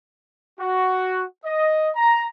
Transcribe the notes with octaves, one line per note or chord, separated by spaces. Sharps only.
F#4
D#5
A#5